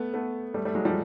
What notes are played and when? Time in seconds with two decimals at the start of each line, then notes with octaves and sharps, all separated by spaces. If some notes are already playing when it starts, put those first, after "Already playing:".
Already playing: A3 B3
0.14 A3 B3
0.54 G3 A3
0.65 G3 A3
0.75 F#3 G#3
0.85 F3 G3